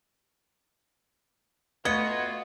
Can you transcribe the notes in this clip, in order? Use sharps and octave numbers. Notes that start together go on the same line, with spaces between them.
A3 B3 F4 F#4 D#5 G#6 C#7